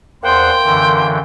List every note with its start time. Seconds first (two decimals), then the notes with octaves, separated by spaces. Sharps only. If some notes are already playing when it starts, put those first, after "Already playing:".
0.23 E2 A#3 C5 F#5 G5 C6
0.64 F#2 D3 E3